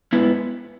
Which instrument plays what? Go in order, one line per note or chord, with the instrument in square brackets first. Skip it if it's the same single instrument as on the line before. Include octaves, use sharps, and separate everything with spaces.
[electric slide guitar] G#2 G#3 B3 E4 B4